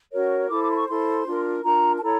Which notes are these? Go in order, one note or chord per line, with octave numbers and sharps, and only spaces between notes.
C#4 F#4 A#4 C#5
E4 A4 C5 D6
D6
C6
C#6
E4 A4 C5 C6
D4 F4 A#4
D4 F4 A#4 A#5
A5
E4 A4 C#5 A#5